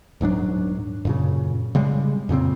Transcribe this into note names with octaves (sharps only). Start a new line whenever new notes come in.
D#1 G#2 F#3 D4
F#2 A#2 C#3
C#3 G3 G#3
F2 A#2 C#3 C4